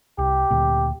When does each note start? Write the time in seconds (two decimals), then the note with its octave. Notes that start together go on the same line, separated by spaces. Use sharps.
0.19 C2 G4
0.51 D2 A#2